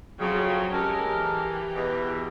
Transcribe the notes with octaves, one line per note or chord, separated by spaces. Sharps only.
F2 C#3 F#3
G#3 C#4 G4 A4 A#4
E3 G4
E2 B2